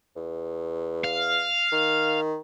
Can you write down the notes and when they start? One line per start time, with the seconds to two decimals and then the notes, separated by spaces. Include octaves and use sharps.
0.16 E2
1.04 F5
1.72 D#3